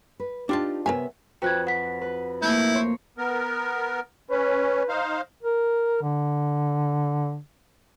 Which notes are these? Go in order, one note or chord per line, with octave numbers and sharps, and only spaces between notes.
B4
D4 D#4 F4 G4 A5
C3 B3 A#4 C#5 E5 G#5
F2 F#4 B4 G5 F#6 G#6
F#5 B6
B4
A3 A#3 D#4 E4 G6
C#5 C6
B3 A#4
C#4 B4
D#4 C5 F5
A#4
D3